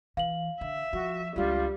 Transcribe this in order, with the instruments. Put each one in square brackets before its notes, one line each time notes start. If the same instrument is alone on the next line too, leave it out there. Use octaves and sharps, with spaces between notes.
[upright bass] E3 [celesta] F5 F#7
[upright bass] D3 [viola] E5
[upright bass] F3 [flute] F#4
[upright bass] C#2 D4 [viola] G3 [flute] F4